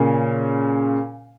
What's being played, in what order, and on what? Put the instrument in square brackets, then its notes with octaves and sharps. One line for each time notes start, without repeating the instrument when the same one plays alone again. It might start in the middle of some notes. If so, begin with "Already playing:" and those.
Already playing: [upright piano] A#2 C#3